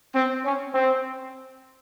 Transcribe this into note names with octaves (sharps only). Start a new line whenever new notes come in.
C4
C#4
C4